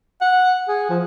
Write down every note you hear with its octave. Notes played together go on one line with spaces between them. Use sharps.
F#5
G#4
F3